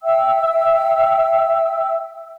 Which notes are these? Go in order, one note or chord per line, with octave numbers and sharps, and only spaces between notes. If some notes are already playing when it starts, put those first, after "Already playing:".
E5 G5 E6